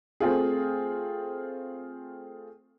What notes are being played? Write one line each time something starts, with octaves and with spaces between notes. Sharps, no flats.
A3 C4 F4 G#4